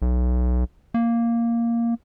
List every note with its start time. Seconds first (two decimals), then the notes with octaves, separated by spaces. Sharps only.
0.02 B1
0.94 A#3